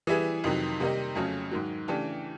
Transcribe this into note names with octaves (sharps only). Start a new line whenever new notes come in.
E3 G3 B3 E4 G#4
F2 C3 D#3 F#3
C3 D#3 G3 A#3 D#4
F2 C#3 F#3 A3 C#4
G#2 D#3 F#3
C#3 E3 A3 D4 G4